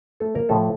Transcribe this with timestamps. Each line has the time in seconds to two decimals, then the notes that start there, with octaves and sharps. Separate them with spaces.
0.20 A3 A4
0.35 A#3 A#4
0.49 A2 F3 A3 A4